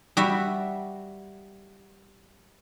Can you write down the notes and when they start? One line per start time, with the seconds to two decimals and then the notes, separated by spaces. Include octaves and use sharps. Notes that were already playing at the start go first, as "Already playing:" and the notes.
0.17 G3 F#4 E5